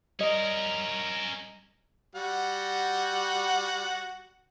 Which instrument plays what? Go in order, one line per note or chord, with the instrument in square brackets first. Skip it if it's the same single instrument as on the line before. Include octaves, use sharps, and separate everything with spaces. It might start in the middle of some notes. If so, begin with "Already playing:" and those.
[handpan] G3 D#5 [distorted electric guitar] C#4 A#4
[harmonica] G3 F#4 F#5